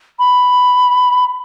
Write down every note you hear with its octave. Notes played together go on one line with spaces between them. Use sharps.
B5